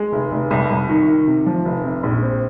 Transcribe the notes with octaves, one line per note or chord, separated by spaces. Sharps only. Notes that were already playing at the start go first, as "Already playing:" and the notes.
Already playing: G#3
F1
F1
C2
C2
D#3
D#3
C3
F3
F1
C3
A#1
C4